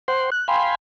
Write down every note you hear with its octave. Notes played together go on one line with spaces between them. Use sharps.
C5 F#5 G5 C6
F#6
F5 G5 G#5 B5 C6